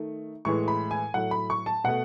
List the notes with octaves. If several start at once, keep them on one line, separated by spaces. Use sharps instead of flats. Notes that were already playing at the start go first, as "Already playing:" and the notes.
Already playing: D#3 A3
A2 E3 G#3 C#6
B5
G#5
A2 F#3 A3 F#5
B5
C#6
A5
B2 A3 F#5